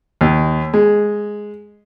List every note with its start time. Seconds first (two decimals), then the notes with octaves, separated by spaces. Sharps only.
0.21 D#2
0.74 G#3